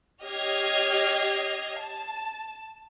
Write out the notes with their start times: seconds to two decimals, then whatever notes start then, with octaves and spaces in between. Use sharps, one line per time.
0.24 G4 C#5 D#5 F6 G#6 C7
1.82 A5